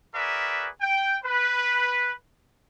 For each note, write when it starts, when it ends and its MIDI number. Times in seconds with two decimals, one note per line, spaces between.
0.15 0.68 66
0.15 0.68 68
0.15 0.68 70
0.15 0.68 71
0.15 0.68 74
0.15 0.68 76
0.81 1.17 79
1.24 2.12 71